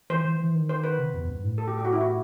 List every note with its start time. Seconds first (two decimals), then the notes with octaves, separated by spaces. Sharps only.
0.10 E3 C5
0.25 E3
0.40 E3
0.54 D#3
0.69 C5
0.84 B4
0.99 C3
1.14 E2
1.28 G2
1.43 A2
1.58 A4
1.68 G4
1.78 G4
1.85 F#4
1.93 E4
2.01 F#4